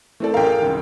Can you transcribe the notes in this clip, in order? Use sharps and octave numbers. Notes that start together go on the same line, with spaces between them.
E3 A3 C4 A4 D5
A1 F#2 A#4 F5 G5
G#4 A4
C2 F#2 D#3